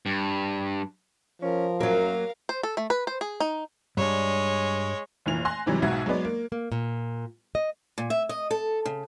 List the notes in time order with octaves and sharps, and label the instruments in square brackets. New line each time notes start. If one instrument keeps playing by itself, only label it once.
[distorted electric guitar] G2
[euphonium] F3 [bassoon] C#4 [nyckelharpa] A#4
[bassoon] F#2 [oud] F#3 A#3 [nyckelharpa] A#4 F5
[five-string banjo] C5
A4
A3
B4
C5
G#4
D#4
[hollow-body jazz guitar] G2 G3 D4 [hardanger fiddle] G#3 C#5
[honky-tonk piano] F1 A#2 E3 F7
G#5 C6 F#6 A#6
G#2 C3 E3 F#3 G3
B1 G#2 B2 F#4 E5 G#6
F#3 G#3 B3 D5
A#3
[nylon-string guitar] A#3
A#2
D#5
[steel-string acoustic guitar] A#2
E5
D#5
A4
C#3